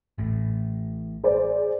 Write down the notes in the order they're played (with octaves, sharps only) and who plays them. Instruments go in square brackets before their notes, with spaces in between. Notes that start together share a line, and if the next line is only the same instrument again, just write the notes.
[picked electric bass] A1 A2
[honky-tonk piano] G#4 C5 D5